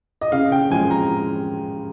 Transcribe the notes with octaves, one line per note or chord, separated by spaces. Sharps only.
D#5
C#3 F5
G5
F3 G#3 G#5
A#5